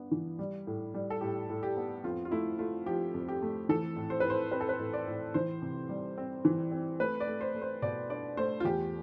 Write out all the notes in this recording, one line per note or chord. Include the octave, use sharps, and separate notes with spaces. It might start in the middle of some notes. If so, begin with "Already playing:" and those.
Already playing: G2 B3 D4
E3
G3
A2
G3
A4
A2 G4
A2
G4
B3
F2 F4
F4
A3 E4
A3 F4
F3 G4
F2
G4
A3
E3 A4
A2
C5
A2 B4
C5
C4 B4
A4
B4
A2
D5
A2
E3 C5
C3
G3
C4
E3
C4
A3 B4
D5
A3
C5
A3
C5
B2 D5
D4 D5
A3 C5
F4
E2 G4